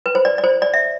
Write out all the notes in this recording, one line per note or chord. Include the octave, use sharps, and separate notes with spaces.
B4
C5
D5
D5
C5
D5
E5